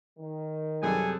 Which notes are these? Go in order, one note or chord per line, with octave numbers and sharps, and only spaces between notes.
D#3
F#2 C3 G3 C4 G#4 A4 G#5